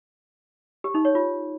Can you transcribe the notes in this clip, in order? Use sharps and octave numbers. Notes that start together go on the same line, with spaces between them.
G4
D#4
C#5
F4